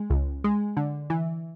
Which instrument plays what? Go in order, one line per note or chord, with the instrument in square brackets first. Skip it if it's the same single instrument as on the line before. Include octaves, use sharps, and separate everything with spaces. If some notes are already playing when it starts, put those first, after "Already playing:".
Already playing: [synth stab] G#3
C#2
G#3
D3
E3